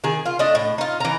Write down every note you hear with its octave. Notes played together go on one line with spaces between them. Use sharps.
D#3 G#4
F4
A3 D4 D#5
A2
D#4 F4
E3 A#5